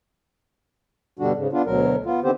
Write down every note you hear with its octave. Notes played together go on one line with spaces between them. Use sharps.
G2 B2 D3 G3 D4 F#4
G#2 C#3
B3 D4 F4
D2 B2 F#3 A#4
B3 F4
D3 D#3 B3 C4 G4 C5